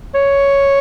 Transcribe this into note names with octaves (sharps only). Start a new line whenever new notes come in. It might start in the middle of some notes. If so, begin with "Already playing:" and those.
C#5